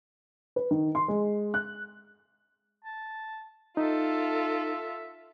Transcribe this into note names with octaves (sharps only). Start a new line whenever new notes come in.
B4
D#3
C6
G#3
F#6
A5
D#4 F4 A4 E5